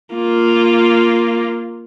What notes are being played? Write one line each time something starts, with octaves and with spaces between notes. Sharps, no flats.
A#3 F4